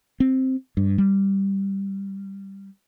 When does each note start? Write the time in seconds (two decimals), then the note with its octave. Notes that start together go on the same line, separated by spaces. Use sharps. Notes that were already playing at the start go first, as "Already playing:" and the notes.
0.20 C4
0.77 G2
0.98 G3